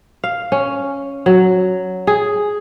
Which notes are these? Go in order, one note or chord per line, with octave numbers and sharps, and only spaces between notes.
F5
C#4
F#3
G#4